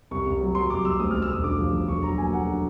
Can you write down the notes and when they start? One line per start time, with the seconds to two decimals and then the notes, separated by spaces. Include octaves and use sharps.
0.11 C2 C#6
0.26 C2
0.41 F#3
0.55 F#3 C6
0.70 C2 D6
0.85 C2 E6
1.00 D2 D#6
1.11 D2 F6
1.22 E6
1.30 E1 D#6
1.44 D3 D6
1.59 F3
1.73 E1
1.88 D3 C#6
2.03 F#3 A#5
2.18 A#3 G#5
2.32 F#3 F#5
2.47 D3